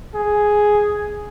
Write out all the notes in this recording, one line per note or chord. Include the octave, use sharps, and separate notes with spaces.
G#4